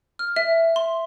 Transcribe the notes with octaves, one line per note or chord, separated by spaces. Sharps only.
F6
E5
C6